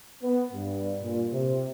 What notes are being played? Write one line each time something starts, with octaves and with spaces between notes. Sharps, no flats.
B3
G2
A#2
C3